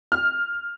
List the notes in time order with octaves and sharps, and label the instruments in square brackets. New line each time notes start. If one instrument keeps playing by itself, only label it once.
[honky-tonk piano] F6